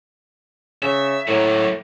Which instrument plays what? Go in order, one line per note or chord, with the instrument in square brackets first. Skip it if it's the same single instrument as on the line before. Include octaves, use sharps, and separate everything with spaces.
[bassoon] C#3 [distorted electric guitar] E5
[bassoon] A2 [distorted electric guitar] F#3 A#3